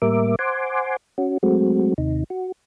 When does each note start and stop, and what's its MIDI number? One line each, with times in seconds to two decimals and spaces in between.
0.02 0.35 45
0.02 0.35 55
0.02 0.35 58
0.02 0.35 70
0.02 0.35 76
0.02 0.35 86
0.39 0.96 72
0.39 0.96 78
0.39 0.96 80
0.39 0.96 84
0.39 0.96 86
1.18 1.38 61
1.18 1.38 66
1.43 1.94 54
1.43 1.94 56
1.43 1.94 57
1.43 1.94 60
1.43 1.94 66
1.98 2.24 39
1.98 2.24 48
1.98 2.24 63
2.30 2.52 66